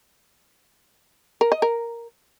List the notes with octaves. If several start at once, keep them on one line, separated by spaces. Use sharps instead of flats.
A#4
D#5
A#4